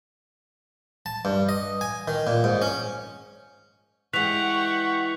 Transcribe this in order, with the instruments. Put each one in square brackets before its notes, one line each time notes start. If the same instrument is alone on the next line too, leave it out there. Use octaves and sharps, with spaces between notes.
[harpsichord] A5
G2
D#5
G#5
D#3
A#2
G#2
C#4
[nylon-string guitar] E3 G#3 [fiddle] G4 F#5 [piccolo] C#6 [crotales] F#6 B6 F7